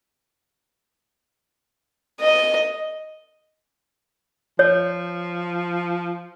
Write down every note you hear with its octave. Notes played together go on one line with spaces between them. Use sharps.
D#5
F3 C#5